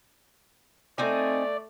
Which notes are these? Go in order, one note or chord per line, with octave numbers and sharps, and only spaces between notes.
A3 C4 D#4 D5 G#5